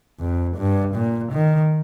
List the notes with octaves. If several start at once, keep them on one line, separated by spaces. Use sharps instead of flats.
F2
G2
A#2
D#3